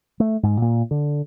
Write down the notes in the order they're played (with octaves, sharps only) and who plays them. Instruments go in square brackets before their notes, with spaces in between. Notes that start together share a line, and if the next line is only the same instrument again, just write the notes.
[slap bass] A3
G#2
A#2
D3